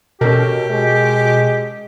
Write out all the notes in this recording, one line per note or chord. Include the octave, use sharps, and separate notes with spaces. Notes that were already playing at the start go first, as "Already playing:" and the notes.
B2 C#4 G4 A4 A#4
G#3